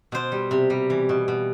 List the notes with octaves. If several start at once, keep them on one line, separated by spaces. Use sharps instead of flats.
B2 C5
G3
C3
G3
E3
B2
B2